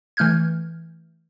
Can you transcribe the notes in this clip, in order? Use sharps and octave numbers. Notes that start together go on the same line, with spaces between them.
E3 A3 F6 G6 G#6